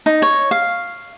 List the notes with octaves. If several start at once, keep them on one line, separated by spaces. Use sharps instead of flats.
D#4
C#5
F5